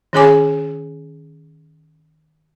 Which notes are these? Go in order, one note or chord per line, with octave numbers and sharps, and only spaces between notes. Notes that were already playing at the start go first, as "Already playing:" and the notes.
D#3 C#4 G#4 C#5 G#5 D6